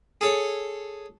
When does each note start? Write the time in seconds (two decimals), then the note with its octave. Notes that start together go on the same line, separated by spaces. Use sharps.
0.21 G#4 A4 C#5